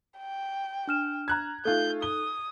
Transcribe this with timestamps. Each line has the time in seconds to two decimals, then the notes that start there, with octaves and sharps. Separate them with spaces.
0.18 G5
0.88 D4 F6 E7
1.28 A#5 F#6 G#6
1.65 A3 D#4 F4 A4 G6
2.02 D#6 G7